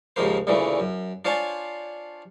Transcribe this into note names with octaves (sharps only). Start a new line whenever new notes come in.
D#2 G#2 C#3 F3 A#3 C5
D2 A#2 C#3 E3 A3
F#2
D4 F4 C5 C#5 G#5 A5